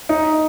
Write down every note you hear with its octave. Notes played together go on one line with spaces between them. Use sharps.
D#4